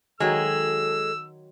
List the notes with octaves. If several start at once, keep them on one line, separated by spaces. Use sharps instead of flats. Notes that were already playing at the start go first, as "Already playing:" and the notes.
D#3 F#3 G#3 A4 E6